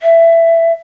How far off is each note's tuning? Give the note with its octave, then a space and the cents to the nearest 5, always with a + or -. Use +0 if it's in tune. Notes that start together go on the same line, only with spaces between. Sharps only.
E5 +15